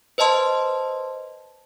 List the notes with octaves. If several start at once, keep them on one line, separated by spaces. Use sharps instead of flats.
B4 C5 D#5 A5 C6